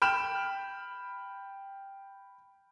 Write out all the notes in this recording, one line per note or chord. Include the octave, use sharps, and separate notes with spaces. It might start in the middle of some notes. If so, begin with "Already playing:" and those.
G5 B5 F6 E7